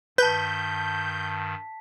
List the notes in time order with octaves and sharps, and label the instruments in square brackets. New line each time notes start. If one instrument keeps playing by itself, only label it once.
[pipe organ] G2 D#3 [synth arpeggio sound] B4 [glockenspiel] A5 B6 [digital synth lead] G6